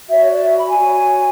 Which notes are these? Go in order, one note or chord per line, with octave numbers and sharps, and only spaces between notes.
F#4 C#5 E5
C#5
D5
E5
B5
G#5
F#4 C#5